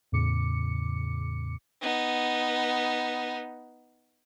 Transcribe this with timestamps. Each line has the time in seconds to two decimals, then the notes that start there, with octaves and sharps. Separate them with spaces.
0.12 E2 A2 C#3 D6 C#7
1.81 B3 D#4